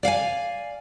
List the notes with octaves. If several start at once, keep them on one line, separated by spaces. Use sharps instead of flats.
D5 F5 F#5 G#5